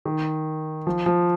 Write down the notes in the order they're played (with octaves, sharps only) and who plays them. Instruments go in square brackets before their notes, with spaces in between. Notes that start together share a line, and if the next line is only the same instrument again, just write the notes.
[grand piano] D#3
F3
F3